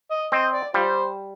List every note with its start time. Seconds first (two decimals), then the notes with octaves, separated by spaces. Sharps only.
0.11 D#5
0.32 C4 D#5
0.54 D5
0.74 G3 F4 C5